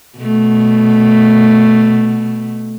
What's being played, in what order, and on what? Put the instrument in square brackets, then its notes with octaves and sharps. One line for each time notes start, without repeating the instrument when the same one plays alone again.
[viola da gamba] B2 A3